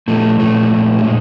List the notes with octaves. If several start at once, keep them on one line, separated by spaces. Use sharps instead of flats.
A#2 F3 A3
A#2 F3 A3
A#2 F3
G3
A#2 G#3